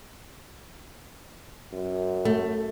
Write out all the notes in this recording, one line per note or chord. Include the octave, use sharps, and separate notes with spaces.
F#2
A3